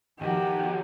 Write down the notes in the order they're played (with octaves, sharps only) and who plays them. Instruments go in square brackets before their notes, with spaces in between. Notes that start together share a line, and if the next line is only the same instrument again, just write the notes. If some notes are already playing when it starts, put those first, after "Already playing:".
[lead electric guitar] B1 F#4 [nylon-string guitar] D#3 F3 [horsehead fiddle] G4